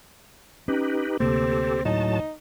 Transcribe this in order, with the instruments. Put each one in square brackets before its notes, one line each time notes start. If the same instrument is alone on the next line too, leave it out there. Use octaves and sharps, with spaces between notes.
[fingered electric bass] C#4 [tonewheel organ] D#4 G4 B4
[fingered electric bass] D2 C3 A#3 [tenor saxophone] C4 [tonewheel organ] G4 A4
[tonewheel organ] A2 F#3 A5 [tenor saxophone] D#4